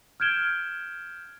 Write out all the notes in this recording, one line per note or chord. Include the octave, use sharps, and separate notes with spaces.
F6 G6 G#6 D7 E7 G7